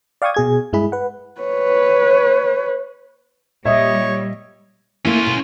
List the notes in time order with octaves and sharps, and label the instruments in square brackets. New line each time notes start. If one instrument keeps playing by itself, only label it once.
[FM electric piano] D5 F5 G5 C#6 D#6 G#6
B2 G#4 G#6
G2 G#3 E4 G#4 B5
B4 F#5
[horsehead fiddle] B4 C#5
[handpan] A#2 D#5 [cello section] G3 [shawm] C#5 [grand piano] E5
[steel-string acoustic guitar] A3 A#3 E4 [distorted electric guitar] C#4 F4
[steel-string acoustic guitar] B2